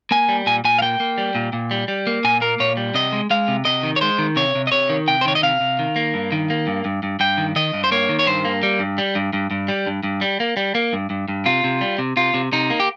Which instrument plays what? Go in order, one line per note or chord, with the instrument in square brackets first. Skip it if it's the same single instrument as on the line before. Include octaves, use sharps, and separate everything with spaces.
[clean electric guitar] A#3 G#5
G3
A#2 G#5
A#2 G#5
F5
A#3 G5
A#3
G3
A#2
A#2
G3
G3
A#3
A#2 G#5
A#3 A#4
A#2 C#5
G3
C3 D#5
G#3
G#3 F5
C3
C3 D#5
D#3
C#5
G#3 C5
D#3
C3 C#5
C3
D#5
C3 C#5
D#3
C3 G5
C5
D#3 C#5
D#5
C3 F5
C3
D#3
A#3
G2
D#3
A#3
G2
G2
G2
G2 G5
D#3
D#3 D#5
G2
C5
A#3 C#5
D#3
C#5
G2 C5
A#3
G3
G2
G3
G2
G2
G2
G3
G2
G2
G3
A#3
G3
A#3
G2
G2
G2
C3 F4
C3
G3
C3
C3 F4
C3
C3 D#4
A#3
G4